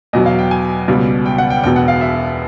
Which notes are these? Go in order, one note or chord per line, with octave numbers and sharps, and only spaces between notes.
E2 B2 F#3 D#5
F5
G5
G#5
C#2 B2 G3
G5
F#5
G5
E1 E2 B2 G5
F#5
F5
E5